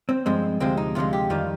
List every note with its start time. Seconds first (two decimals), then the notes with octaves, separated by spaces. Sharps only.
0.09 C4
0.26 G2 F3 G#3 C4
0.60 D2 C3 F3 G#3 C4
0.77 D#4
0.95 D2 C3 F3 G#3 F4
1.13 G4
1.30 F2 D#3 G3 F4